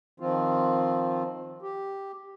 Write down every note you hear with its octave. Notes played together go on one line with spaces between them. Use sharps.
D#3 F3 C4 F4
G4